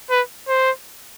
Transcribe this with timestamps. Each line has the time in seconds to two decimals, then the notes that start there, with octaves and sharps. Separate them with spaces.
0.10 B4
0.48 C5